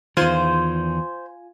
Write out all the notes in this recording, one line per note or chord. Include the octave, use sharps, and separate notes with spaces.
E2 D#3 F4 C5 G#5